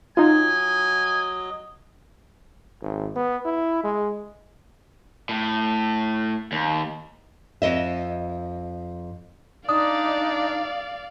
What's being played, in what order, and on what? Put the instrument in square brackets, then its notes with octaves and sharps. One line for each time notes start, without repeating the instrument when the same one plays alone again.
[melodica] F#3 D#5 [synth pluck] D#4 F4 [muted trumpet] G#5
[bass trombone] G#1
B3
E4
G#3
[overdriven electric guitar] A2
D#2
[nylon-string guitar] F2 D#5 E5
[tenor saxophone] D4 [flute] D#4 [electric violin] D5 F5 [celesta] D#6